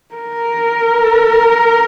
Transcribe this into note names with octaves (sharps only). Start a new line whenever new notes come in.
A#4